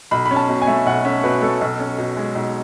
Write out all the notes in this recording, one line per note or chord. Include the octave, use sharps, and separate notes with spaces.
B1 B5
B5
C#4
A5
B2
G#5
A3
B1 F#5
C#4 E5
B2 B4
A3 A4
B1
C#4
B2
G#3
B1